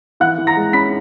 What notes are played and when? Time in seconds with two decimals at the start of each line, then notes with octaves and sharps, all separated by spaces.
0.20 E3 F#5 F#6
0.38 E3
0.47 A#5 A#6
0.56 G#3
0.73 C#4 B5 B6